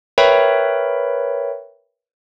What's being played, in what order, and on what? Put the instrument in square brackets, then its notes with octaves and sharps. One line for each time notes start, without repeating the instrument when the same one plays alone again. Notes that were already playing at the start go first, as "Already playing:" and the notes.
[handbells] A#4 B4 C#5 E5 G5 B5